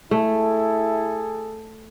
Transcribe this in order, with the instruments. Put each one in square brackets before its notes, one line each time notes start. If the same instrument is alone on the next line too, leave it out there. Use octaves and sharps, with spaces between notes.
[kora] A3 [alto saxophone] E4 [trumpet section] G#4 A4